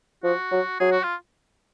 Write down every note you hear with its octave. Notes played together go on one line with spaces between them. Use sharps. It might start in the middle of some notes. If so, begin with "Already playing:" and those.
F3 F#4
F#3
F#3 G#4
F#4
F4